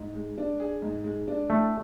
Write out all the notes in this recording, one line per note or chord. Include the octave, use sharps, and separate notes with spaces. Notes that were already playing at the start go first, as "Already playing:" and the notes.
Already playing: G#2
G#3
D4
G#4
G#2
G#3
D4
A2 A3